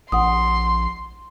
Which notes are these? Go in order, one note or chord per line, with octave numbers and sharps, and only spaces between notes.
A#1 F#5 C6 D#6